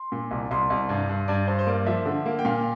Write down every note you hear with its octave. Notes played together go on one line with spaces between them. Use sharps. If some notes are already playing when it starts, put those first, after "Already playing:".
Already playing: C6
A#2
C2
C2 C6
C2
G2
G2
G2 D5
G2 C5
C5
A#3 D5
F3 E5
D3
A#3
G5
A#2 F5